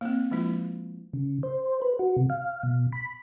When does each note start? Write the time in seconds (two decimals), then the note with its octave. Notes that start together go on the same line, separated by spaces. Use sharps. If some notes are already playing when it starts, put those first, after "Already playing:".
0.01 A#3 C4
0.31 F3 G#3 A#3 E4 F4
1.13 C#3
1.43 C5
1.82 B4
1.99 F#4
2.17 C3
2.30 F5
2.63 B2
2.93 B5